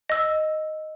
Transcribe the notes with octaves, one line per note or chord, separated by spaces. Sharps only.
D#5 E6